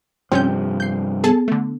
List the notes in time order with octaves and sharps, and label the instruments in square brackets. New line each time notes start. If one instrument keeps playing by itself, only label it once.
[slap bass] G2 C3 F3 [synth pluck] C4 C#4 G6
[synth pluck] G6 C7
[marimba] B3 [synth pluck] G#4 A4 A5
[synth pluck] D3 A3